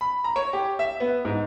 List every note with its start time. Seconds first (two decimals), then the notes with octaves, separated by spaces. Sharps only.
0.01 B5
0.24 A#5
0.36 C#5
0.53 G4
0.79 E5
1.00 B3
1.25 G#2